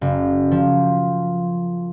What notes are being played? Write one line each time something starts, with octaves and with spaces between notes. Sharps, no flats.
F#1
F3